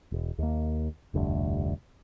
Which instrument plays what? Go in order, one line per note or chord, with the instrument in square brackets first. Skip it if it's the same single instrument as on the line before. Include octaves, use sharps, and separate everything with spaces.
[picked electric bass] E1
D#2 A#3
F1 D2 G2